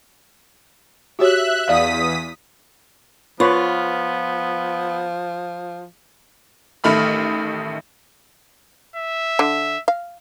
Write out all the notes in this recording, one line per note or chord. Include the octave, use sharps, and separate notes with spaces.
F#4 G4 C#5 E5 F#6
E2 D5 F5 D#6 B6
F3 B3 F4 B4 C#5
A1 D#3 A3 B5 F6
E5
D3
F5